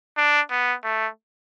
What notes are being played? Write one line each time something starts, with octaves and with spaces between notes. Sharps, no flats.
D4
B3
A3